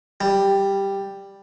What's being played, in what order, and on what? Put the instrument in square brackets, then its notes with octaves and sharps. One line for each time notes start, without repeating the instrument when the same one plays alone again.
[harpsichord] G3